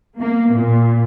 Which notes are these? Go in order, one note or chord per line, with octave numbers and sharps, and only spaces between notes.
A#3
A#2